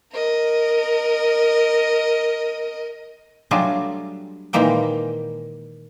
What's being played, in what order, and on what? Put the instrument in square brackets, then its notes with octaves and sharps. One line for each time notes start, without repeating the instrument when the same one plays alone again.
[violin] A#4 D#5
[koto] F#3 G3 A3 D4 F4 G#4
A#2 D#3 E3 G#3 A#3 G5